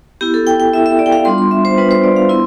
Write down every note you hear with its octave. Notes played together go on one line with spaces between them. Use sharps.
B3 E4 G4
A4
G5
G5
B3 E4 E5
E5
D5
G5
F5
G3 B3 D4 F4 C6
C6
E5
C5
G3 B3 D4 F4 B4
C5
D5
F5
B3 E4 C6